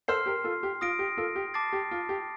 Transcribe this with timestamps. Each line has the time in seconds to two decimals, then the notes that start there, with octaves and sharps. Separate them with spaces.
0.08 A4 C5 C6 F6 C7
0.26 G4 A#4
0.44 F4 A4
0.63 G4
0.81 F4 D#6 A#6 D7
0.99 G4
1.17 F4 A4
1.36 G4
1.54 A5 D6 A6 C7
1.73 G4
1.91 F4
2.09 G4